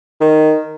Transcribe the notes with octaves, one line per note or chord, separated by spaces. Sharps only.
D#3